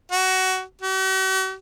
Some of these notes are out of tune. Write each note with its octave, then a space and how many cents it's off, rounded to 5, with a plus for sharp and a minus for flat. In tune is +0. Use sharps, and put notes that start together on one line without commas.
F#4 +20
F#4 +45